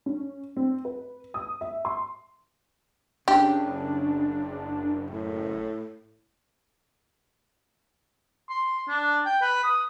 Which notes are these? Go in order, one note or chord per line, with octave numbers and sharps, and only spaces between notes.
C#4
C4
B4
D#6
E5
C6
F#1 C#3 D4 G4
A2
C6
D4
G5
B4
D#6